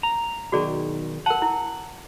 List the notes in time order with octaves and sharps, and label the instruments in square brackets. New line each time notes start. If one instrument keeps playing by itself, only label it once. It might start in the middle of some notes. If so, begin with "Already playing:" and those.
[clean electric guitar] A#5
[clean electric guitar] B1 D#3 [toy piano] F#4 G#4 D5
[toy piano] A#4 A5 [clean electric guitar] F#5
[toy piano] E4